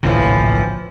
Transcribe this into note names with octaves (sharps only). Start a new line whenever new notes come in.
D1 A#1 A2 C3 E3 F3